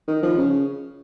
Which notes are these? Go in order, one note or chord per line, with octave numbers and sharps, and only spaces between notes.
D#3
F3
C#3